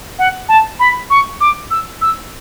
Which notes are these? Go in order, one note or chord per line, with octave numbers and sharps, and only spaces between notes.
F#5
A5
B5
C#6
D6
E6
E6